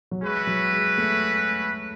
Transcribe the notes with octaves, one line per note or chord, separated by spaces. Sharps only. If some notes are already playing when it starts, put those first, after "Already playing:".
F#3
G#3 C#4 F#4 B4 E5
F#3
G#3
A3